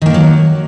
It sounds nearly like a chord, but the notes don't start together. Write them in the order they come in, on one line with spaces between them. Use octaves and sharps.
D#3 A#3 D3 F#3